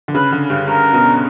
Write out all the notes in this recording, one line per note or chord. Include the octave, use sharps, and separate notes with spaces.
D3
C#3 B4
D3
G2
G2 A#4
B2